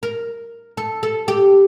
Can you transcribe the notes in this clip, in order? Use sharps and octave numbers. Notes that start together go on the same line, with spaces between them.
A#4
A4
A4
G4